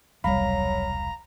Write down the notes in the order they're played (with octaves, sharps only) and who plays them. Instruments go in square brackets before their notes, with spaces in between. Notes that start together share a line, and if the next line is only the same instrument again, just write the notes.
[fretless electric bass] E1 C2 G3 [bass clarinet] F#3 [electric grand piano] F5 B5 [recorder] A#5